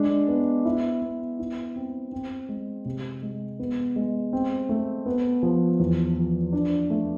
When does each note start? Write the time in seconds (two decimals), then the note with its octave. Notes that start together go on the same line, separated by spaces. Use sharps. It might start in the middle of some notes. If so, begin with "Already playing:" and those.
Already playing: G#3 D4
0.28 B3
0.65 E4
1.02 B3
1.39 E4
1.76 C4
2.12 C4
2.49 G#3
2.85 C3
3.22 G#3
3.59 B3
3.96 G#3
4.33 C4
4.69 A3
5.06 B3
5.43 F3
5.80 E2
6.16 F3
6.53 D4
6.90 A3